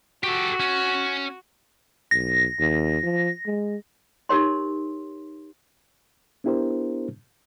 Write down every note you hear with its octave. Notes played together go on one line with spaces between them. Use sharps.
F#4 G4 A4
C#4
B1 A#6
D#2
F3
G#3
D#4 G4 A#4 C#5 C6
B3 D4 E4 G4 A#4 C5